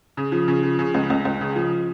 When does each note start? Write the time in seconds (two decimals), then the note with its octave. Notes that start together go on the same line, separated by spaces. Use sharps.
0.17 C#3
0.32 F3
0.48 C#3
0.63 F3
0.79 C#3
0.94 C#2
1.10 C#2
1.25 C#2
1.41 C#3
1.56 F3